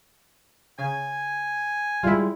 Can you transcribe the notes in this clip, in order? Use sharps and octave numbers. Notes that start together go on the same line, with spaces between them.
C#3 G#5
G3 G#3 E4 F4